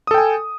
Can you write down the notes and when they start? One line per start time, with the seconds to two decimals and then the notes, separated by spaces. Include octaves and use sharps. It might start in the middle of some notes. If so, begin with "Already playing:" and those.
0.07 D#6
0.11 A4
0.14 G5
0.18 G#5